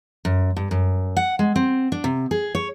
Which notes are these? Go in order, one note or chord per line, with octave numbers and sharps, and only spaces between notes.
F#2
G2
F#2
F#5
G#3
C4
D4
C3
G#4
C#5